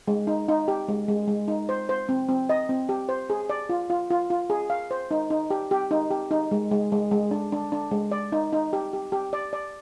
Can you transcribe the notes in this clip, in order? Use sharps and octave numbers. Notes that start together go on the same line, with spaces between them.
G#3
D#4
D#4
G4
G#3
G#3
G#3
D#4
C5
C5
C4
C4
D#5
C4
G4
C5
G#4
D5
F4
F4
F4
F4
G#4
F5
C5
D#4
D#4
G4
G4
D#4
G4
D#4
G#3
G#3
G#3
G#3
D4
D4
D4
G#3
D5
D#4
D#4
G4
G4
G4
D5
D5